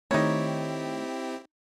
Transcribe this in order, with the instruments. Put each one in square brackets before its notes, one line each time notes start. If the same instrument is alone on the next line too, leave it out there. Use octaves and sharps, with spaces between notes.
[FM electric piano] D#3 A3 [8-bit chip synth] C4 E4 G4 [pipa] D#4 A#4 C#5